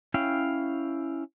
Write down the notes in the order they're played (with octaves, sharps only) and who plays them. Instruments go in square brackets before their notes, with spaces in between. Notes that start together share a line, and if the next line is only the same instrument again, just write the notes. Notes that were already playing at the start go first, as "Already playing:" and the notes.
[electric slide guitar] C#4 E4 F5 G5